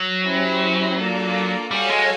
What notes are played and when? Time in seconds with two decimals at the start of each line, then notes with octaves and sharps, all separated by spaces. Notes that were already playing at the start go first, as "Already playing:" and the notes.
Already playing: F#3
0.24 C#4 E4 G4 C5
0.97 A#3 D4 F4 A4 D5
1.71 G3 F#4 A4 C#5 F5 G#5
1.90 G#3